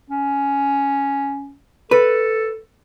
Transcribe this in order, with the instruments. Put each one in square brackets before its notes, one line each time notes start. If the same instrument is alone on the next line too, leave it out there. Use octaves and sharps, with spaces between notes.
[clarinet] C#4
[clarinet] A4 [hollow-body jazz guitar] B4